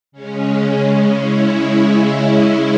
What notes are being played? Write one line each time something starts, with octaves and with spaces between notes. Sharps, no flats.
C#3 G#3 C#4
E4